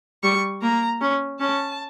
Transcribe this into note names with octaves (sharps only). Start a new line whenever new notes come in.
G3 C#6
A#3 A#5
C#4
C#4 A5